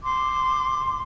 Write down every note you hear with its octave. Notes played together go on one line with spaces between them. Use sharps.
C6 D6